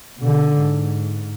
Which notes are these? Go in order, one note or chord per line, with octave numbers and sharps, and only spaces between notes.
B2 D3
G#2